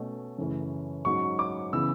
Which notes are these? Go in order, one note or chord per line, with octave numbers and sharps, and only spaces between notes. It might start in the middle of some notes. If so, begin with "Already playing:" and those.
Already playing: B2 A3 C#4
F#2 C#3 E3 A3 C#4
G#2 F#3 C#4 C#6
D6
C#3 E3 B3 E6